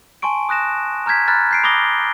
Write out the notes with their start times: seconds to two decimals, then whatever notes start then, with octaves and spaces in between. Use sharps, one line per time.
0.22 G#5 A5 C6 C#6 D7
0.49 D#6 F#6 A#6 E7
1.06 A#5 F6 G6 G#6 B6
1.28 A#5 B5 F6 F#6 A6
1.51 G6 C7 D7
1.64 B5 D6 D#6 A#6 G7